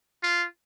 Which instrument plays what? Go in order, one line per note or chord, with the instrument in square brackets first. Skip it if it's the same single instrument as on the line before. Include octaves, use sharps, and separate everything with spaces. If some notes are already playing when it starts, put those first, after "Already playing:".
[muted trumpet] F4